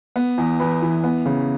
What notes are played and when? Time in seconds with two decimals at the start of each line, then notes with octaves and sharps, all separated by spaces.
0.16 B3
0.38 E2
0.60 E2 B4
0.82 E3
1.04 B3
1.26 C#3